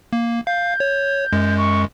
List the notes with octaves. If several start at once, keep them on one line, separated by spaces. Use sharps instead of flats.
A#3
F5 G6
C#5
F#2 G#3
C#6